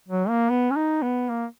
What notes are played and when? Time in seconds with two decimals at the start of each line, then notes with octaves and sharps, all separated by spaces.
0.09 F#3
0.29 A#3
0.50 B3
0.71 C#4
0.76 D#4
1.02 B3
1.29 A#3